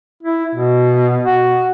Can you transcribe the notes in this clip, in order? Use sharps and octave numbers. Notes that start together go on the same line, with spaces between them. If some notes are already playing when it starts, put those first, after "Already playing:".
E4
B2
F#4